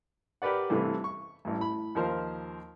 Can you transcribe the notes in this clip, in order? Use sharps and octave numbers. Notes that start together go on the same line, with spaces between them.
G4 A#4 B4 D5 F#5
G2 C3 E3 A3
C#6
A1 G2
A2 B5
D#2 F3 A#4 C5 F6